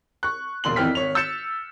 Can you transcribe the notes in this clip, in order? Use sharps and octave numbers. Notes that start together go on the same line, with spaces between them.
C#6 F#6
E1 A#1 C6 F#7
G#1 F2 E3 G5 F6 B6
G#1 C#5 F7
E6 G6 A6 C#7 E7